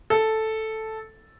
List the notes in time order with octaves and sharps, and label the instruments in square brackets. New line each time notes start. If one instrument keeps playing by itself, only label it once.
[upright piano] A4